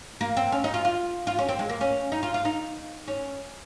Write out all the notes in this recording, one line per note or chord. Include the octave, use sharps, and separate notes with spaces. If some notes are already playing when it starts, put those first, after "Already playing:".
A#3
C4
C#4
D#4
F4
F4
F4
C#4
C4
G#3
A#3
C#4
D#4
F4
F4
D#4
C#4